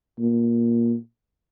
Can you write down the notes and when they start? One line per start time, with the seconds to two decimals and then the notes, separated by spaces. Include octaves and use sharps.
0.19 A#2